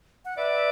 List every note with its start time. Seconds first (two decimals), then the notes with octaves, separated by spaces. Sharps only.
0.25 F#5
0.37 B4 D5 E5